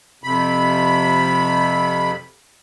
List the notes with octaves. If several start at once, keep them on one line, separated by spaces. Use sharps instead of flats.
F2 C3 B5